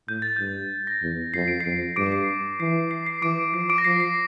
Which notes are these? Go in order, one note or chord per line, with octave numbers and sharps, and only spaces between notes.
A2 G6
A6
G2 G6
A#6
E2
F2 C7
D7
F2 C7
G2 D6 D7
D7
C7
E3 C7
C7
C7
E3 D6 D7
F3 C7
D6 D7
A#6
F3 C7
C7